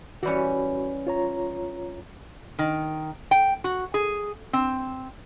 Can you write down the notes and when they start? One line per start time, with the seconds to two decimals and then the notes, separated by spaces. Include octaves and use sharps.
0.23 E3 G3 C#4 F#4 B5
1.07 F4 C#5 A#5
2.59 D#3
3.31 G5
3.64 F#4
3.94 G#4
4.53 C4